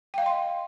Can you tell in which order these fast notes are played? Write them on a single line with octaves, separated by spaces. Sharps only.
G5 F5 D#5 C6